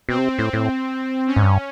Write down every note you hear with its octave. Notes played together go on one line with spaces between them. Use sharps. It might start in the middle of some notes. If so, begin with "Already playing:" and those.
B2 C4
C3
A2 C4
A2
C#4
G#2
G2